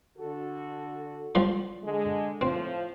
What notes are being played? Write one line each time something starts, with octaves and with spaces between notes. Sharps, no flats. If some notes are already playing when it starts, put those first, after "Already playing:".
D3 F#4 A4
F3 G3 C6
D3 G#3
A2 F3 C4